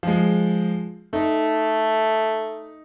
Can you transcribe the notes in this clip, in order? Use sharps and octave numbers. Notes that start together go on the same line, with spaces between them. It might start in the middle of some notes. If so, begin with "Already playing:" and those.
F3 G#3
A3 D#4